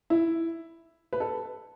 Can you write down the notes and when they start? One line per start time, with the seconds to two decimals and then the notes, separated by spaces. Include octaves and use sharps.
0.10 E4
1.13 B4
1.20 A4